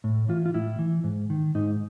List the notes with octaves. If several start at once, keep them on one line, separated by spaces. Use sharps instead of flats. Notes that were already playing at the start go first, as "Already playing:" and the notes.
A2
E3 F4
F4
A2 E4
E3
G#2
D#3
G#2 D#4